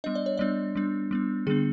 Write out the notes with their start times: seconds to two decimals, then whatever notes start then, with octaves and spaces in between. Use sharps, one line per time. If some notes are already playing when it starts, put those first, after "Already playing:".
0.04 G3 B3 D4 D#5
0.15 D5
0.26 C#5
0.37 G3 B3 D4 D5
0.75 G3 B3 D4
1.11 G3 B3 D4
1.46 D3 G3 B3 D4 G#4